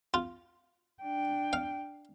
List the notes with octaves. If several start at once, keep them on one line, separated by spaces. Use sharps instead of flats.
F4
D4 G5
F5